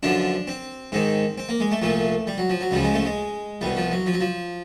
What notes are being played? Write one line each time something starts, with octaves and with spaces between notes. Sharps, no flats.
F#2 D3 F3 D4
C4
G#2 D#3 C4
C4
A#3
G#3
A3
C2 A#2 F3 A3
G3
F#3
F3
F#3
C#2 C#3 F3 G3
G#3
A3
G#3
C2 B2 G3
F3
F#3
F3
F#3
F3